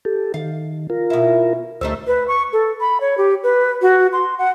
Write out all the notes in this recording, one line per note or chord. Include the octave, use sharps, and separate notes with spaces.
G4 A4
D#3 F5
F4 A#4
B2 E4
D2 G3 A3 D#4 C5 E6
B4
C#6
A4
B5
C#5
G4
B4
F#4
C6
F#5